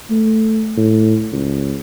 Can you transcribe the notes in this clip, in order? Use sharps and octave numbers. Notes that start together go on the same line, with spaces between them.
A3
A2
C#2